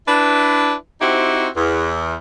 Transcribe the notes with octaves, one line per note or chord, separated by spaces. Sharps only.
D4 E4 B4
C4 D#4 E4 F#4 G4 C5
E2